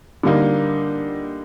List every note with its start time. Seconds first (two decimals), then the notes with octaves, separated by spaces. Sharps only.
0.23 D3 G3 A#3 D#4